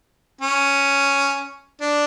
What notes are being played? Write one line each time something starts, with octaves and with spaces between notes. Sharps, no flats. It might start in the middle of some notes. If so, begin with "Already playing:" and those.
C#4
D4